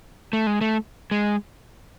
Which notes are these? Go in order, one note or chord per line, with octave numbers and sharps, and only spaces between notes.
A3
G#3
A3
G#3